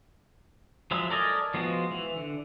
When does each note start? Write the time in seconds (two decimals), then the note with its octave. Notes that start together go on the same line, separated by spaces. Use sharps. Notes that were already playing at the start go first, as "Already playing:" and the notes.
0.91 F3 F#3 G#3 E4
1.10 A4 A#4 D5 D#5 G#5
1.54 F3 G#3 B3 F4 F#4
1.91 E3
2.16 D3